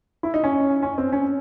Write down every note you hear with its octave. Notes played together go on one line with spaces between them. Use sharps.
E4
D#4
C#4
C#4
C4
C#4